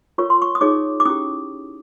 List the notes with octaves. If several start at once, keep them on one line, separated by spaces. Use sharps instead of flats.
F4 A#4 C#5 C#6
C6
C#6
D#6
D#4 G#4 C#5 D6
D6
C#4 E4 G4 D#6